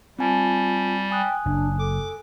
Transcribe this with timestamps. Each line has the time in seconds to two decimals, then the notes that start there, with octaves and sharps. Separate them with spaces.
0.19 G3 C4 F4 G#5 A5
1.11 G5 G#5 D#6 F#6
1.46 F#1 D4
1.79 A4 D6